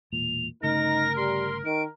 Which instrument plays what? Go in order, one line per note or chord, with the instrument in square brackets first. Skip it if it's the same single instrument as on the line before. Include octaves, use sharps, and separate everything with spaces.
[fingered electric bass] E1 A#2 [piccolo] F7
[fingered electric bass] G1 C#3 A3 [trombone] D#4 [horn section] A#4 [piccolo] A#6
[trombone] G3 [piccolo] C6
[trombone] D#3 [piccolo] D7